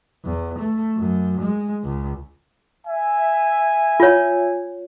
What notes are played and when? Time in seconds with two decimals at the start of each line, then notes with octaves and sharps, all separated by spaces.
0.24 E2
0.59 A3
0.97 F#2
1.41 G#3
1.84 C#2
2.86 E5 G#5
4.00 F4 C#5